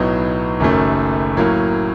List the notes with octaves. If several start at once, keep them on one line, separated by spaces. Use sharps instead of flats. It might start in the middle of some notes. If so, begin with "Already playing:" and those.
Already playing: B1 A2 F#3 B3 D#4
F#1 F#2 D#3 F#3 A3
A2 F#3 A#3